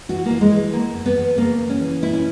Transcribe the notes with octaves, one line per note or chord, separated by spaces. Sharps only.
E3 F#4
E3 A#3
G#3
E3
G#3
E2 A#3
E2
B3
E2
C#3 A#3
E2
C#4
E3
A#2 E4
C#4